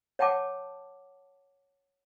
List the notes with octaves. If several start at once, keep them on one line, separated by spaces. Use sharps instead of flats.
C#5 F#5 G5 A5 D6